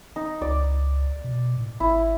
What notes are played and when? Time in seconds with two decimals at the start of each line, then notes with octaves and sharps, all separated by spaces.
0.16 D#4
0.42 C#2 D5
1.24 B2
1.57 A2
1.80 G#1 E4